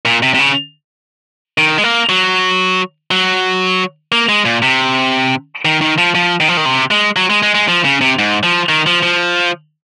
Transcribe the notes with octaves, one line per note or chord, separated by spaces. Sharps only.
A#2
C3
C3
C#3
D#3
G#3
A#3
F#3
F#3
A#3
G#3
A#2
C3
D#3
D#3
F3
F3
D#3
F3
D#3
C3
G#3
F#3
G#3
G#3
G#3
F3
C#3
C3
G#2
F3
D#3
F3
F3